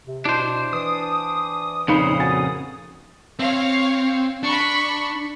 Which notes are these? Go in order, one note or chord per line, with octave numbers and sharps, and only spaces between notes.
C3
B2 D4 E4 C5
E3 D#6
F2 A#2 C#3 D#4 B5 C7
F#4 G#5 A6
C4 C#5 F5
D4 B5 C#6